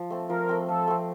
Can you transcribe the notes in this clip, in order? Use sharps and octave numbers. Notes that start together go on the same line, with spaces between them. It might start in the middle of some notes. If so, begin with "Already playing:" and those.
Already playing: F3
A3 C4
F3 A#4
A3 C4
F3 A4
A3 C4